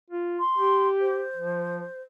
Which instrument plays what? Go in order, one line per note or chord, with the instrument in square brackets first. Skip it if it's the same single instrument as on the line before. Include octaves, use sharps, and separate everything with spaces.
[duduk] F4
[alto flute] C6
[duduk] G4
[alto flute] C5
[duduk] F3